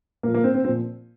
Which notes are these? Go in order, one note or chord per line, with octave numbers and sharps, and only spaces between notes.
A#2 F3 A#3
A#3
C4
C4
A#2 F3 C4